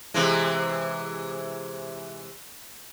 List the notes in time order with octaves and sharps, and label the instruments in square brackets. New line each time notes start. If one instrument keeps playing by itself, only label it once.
[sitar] C3 E3 G#3